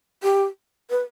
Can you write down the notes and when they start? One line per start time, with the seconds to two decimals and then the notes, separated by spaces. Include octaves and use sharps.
0.23 G4
0.90 B4